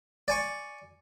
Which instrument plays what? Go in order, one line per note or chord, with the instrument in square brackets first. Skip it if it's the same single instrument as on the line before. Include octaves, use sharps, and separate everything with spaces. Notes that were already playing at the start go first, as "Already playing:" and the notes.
[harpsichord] D5 G#5 C#6